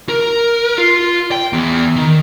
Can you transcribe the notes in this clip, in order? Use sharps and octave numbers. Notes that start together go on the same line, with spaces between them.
A#4
F4
G5
E2
D#3